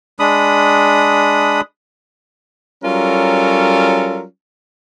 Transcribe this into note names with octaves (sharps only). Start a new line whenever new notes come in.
G#3 D4 B5 D#6
F#3 G3 C#4 F4 A4 A#4